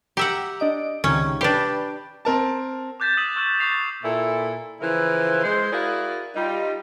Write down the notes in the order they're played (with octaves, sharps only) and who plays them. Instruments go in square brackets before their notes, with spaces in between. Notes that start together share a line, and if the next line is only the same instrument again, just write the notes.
[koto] G4 E5 F#5 [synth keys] A#5
[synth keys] D4 D#5 D7
[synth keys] C#2 C3 D#3 [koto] C#4
[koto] D4 G4 [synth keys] B4 G5
[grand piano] C4 A#4 A5
[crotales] D6 F#6 G6 A6 B6 E7
D#6 E6 B6 D#7 E7 F#7
C#6 E6 F#6 D#7 E7 F#7
C#6 D6 A6 C7 F7
[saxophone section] A#2 E4 A4
C#3 E3 F3 E4 A#4 C5
G#3 C5
E4 F#4 G#4 A#4 D5 F5
G3 D#4 F4